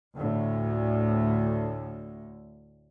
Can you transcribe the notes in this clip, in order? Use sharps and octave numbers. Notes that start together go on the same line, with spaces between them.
D2 A2